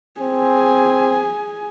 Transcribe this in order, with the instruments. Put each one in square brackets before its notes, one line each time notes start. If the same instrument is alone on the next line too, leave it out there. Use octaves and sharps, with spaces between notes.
[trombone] C4 [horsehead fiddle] G#4 G#5